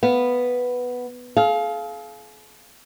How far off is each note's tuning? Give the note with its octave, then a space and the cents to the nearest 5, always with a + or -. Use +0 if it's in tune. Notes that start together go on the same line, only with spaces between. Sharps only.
B3 +0 F5 +0
G#4 +45 F5 -5